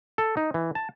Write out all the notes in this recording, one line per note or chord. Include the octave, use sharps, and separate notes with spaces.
A4
D#4
E3
A5